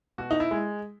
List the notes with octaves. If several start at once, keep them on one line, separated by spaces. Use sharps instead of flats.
B2 F#4
D#4
E4
G#3